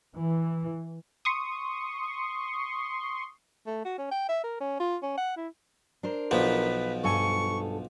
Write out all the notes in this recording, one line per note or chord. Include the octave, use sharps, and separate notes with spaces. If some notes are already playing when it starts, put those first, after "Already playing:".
E3
C6 C#6 D#6
A3
F#4
C#4
G5
E5
A#4
C#4
F4
C#4
F#5
E4
D4 A#4 C5
B1 F3 B4
G2 A4 G#5 C#6